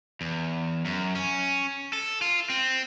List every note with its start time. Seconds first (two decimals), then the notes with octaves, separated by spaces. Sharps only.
0.21 E2
0.85 F#2
1.15 C#4
1.93 A4
2.22 F4
2.49 C4